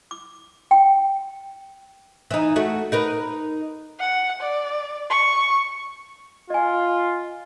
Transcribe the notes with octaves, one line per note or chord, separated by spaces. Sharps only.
D6
G5
E3 D#4
A3 F#4
D#4 A#4 B4
F#5
D5
C#6
F4 D#5 G#5